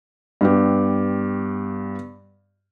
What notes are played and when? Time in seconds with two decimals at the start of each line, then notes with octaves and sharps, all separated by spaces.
0.41 G2 B3 G4